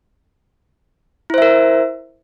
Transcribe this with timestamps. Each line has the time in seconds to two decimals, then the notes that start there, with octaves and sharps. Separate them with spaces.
1.30 E4
1.34 C5
1.38 E5
1.42 A#4